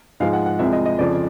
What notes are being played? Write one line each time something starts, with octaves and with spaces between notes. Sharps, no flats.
G#2 F3 G#3 F5
F#5
F#5
C2 C3 F3 G#3 E5
D#5
D#5
F2 C#3 F3 D5